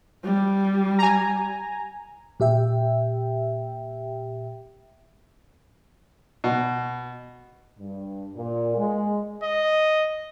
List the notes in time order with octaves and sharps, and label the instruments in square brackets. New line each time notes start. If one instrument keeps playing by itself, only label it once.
[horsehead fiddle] G3
[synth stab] G#5 A#5
[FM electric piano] A#2 G4 E5 G5
[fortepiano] B2
[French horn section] G2
A#2
G#3
[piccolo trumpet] D#5